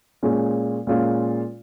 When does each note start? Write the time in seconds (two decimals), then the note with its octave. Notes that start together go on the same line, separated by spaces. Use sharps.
0.22 A#2 G#3 C#4 F4
0.87 A#2 G#3 C#4 F4